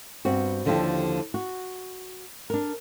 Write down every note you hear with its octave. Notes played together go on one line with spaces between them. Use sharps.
G2 B3 C4 F#4
D#2 D3 F3 E4 G4 A4
F#4
D4 A#4